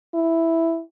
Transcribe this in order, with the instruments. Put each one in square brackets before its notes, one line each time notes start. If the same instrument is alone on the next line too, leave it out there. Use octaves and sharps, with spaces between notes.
[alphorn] E4